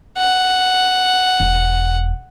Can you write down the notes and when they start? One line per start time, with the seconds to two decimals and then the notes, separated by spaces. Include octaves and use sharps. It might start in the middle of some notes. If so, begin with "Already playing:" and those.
0.18 F#5
1.40 E1